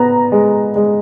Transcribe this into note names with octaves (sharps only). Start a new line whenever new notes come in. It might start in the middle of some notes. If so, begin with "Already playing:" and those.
Already playing: B3 A#5
G#3
G#3